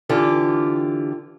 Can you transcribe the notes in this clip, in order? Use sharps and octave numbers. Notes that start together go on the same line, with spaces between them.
D3 E3 F4 G4